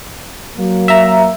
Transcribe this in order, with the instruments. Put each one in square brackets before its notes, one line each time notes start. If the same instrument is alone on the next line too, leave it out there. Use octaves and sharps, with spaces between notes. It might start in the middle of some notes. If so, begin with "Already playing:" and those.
[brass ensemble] F#3 A#3
[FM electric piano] E5 A#5